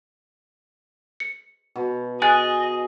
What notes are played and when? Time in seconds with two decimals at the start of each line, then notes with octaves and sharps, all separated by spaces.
1.20 C#7
1.76 B2 B4
2.22 G#4 D#5 G#5 F#6 A6